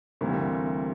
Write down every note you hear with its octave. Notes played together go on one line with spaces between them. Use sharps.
D2 C3 E3 G3 A#3